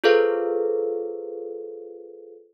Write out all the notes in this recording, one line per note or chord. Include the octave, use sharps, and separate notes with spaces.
F4 G#4 A4 B4 C5 F5